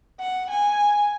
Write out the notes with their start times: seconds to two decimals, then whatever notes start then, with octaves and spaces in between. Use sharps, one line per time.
0.20 F#5
0.50 G#5